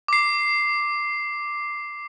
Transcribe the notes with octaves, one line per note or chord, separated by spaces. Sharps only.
D6 C7